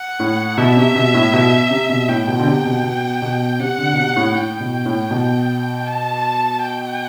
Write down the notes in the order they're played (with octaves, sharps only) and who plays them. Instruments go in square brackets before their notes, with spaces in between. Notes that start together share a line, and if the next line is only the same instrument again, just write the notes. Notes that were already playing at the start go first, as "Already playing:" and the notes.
Already playing: [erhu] F#5
[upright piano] A2
[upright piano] B2 [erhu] E5
[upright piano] C3
B2
A2
B2
C3
B2
[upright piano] A2 [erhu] G5
[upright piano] B2
D3
C3
B2
B2
B2
[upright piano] C3 [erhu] F#5
[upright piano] D3
B2
C3
A2
[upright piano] A2 [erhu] G5
[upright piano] B2
A2
B2
[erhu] A5
G5